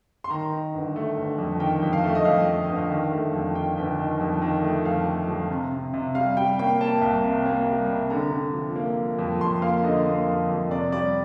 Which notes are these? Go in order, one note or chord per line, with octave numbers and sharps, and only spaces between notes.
C6
D#3 A#5
D#3
G1
A3
G1
F2
D#3 G5
F2
F5
A3
D#5
F2 F5
A3
G1
D#3
A3
F2
D#3 G5
G1
D#3
F2
D#3
A3
F2 F5
A3
F2
C3
C3
C3
G3 F5
G3 G5
A#3 G5
A#3 A5
C2
C3
A#3
G3
C3
D3 A#5
D3
F3
A#3
F3
F2
F2 C6
A#3 F5
D3 D#5
A#3
F2
F2
C3 D5
G3 D5